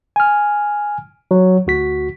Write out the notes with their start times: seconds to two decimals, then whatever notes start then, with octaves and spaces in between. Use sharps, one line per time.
0.16 G#5 F6
1.31 F#3
1.67 D2 F#4 B6